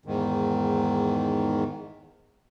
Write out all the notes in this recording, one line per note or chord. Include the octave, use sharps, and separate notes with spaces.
E2 G#2 D#3